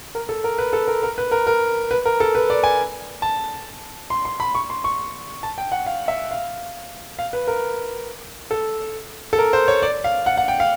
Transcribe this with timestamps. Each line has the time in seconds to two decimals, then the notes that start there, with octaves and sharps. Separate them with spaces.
0.15 A#4
0.29 A4
0.44 A#4
0.58 B4
0.73 A4
0.88 A#4
1.03 A#4
1.18 B4
1.32 A#4
1.47 A#4
1.91 B4
2.05 A#4
2.20 A4
2.35 B4
2.50 D5
2.64 G#5
3.22 A5
4.10 C6
4.25 C6
4.40 B5
4.55 C#6
4.70 C6
4.84 C#6
5.43 A5
5.58 G5
5.72 F#5
5.86 F5
6.08 E5
6.31 F5
7.19 F5
7.33 B4
7.47 A#4
8.51 A4
9.33 A4
9.39 A#4
9.53 C5
9.68 C#5
9.82 D5
10.04 F5
10.26 F#5
10.37 F#5
10.48 G5
10.60 F5